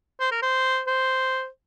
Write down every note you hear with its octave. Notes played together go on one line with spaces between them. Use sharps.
C5
A#4
C5
C5